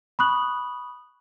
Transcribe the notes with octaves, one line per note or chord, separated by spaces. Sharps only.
B5 C#6 D#6 F#6 F#7